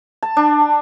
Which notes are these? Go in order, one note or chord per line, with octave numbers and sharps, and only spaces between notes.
A5
D4